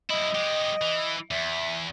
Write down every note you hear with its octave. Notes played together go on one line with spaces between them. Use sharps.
F#2 E4 D#5
G#3 G4
E3
E2 E5